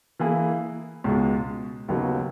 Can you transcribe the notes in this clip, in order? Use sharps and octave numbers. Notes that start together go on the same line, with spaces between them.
E3 A#3 E4 G#4
C#2 B2 G#3
D#2 C#3 F#3 B3 D#4